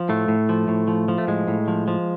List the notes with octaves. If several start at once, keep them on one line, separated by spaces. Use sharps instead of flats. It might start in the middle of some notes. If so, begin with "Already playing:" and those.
Already playing: F3
A2 A3
A2
F3
A2
F3
F3
A3
A2 G#3
A2
F3
F3